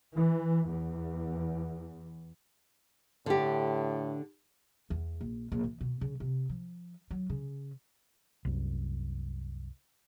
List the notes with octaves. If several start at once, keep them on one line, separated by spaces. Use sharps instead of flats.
E3
E2
A2 D3 G4
E2
A#1
A#1
E3
B2
C#3
C3
F3
F#3
C#3
C2 F#2